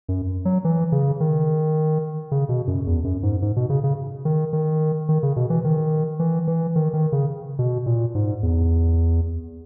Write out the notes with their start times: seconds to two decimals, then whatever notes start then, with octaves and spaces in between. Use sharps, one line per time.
0.09 F#2
0.45 F#3
0.65 E3
0.92 C#3
1.20 D#3
2.31 C#3
2.49 B2
2.67 F#2
2.87 E2
3.04 F#2
3.23 G#2
3.42 G#2
3.56 B2
3.70 C#3
3.84 C#3
4.25 D#3
4.53 D#3
5.09 D#3
5.23 C#3
5.36 B2
5.50 E3
5.64 D#3
6.20 E3
6.47 E3
6.76 D#3
6.93 D#3
7.12 C#3
7.59 B2
7.86 A#2
8.15 G#2
8.43 E2